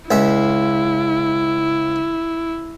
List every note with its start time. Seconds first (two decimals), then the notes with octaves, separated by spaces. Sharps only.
0.11 C#2 E4 E5